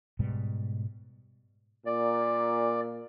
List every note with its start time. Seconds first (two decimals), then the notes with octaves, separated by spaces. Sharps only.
0.19 G#2 B2 G3
1.86 A#2 D5